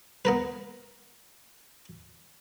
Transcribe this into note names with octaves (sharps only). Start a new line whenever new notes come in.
B3 A#4 B4